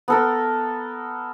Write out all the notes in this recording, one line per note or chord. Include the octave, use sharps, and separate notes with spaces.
B3 A4 A#4